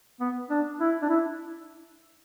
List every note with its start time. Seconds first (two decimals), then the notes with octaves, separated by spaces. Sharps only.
0.20 B3
0.50 D4
0.80 E4
1.02 D4
1.09 E4